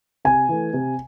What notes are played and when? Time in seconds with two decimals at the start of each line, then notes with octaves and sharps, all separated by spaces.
0.25 C3 G#5
0.49 E3 A3
0.73 C3